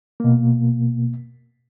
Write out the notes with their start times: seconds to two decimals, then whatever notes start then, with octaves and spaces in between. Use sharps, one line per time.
0.20 B2 A#3